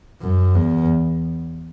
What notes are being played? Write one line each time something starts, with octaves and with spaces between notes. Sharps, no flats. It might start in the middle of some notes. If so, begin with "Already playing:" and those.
F#2
E2